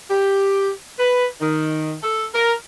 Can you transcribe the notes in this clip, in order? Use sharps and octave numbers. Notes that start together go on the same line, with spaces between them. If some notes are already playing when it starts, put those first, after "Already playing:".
G4
B4
D#3
A4
A#4